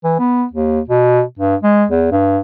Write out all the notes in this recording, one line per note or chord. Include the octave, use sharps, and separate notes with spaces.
E3
B3
D#2
B2
G2
G#3
E2
G2